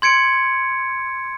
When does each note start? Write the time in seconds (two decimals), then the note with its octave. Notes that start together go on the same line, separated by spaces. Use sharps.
0.02 C6 G#6 C#7 D7